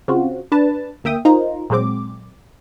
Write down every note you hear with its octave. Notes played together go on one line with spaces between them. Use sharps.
C#3 C4 F4 F#4
D4 B4 A5
D2 A#3 E5 G5 D#6
D#4 F4 A#4 C5
A#2 F#3 G#3 C4 D6